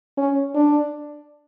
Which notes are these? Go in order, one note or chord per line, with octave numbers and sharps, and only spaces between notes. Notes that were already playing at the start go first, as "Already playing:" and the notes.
C#4
D4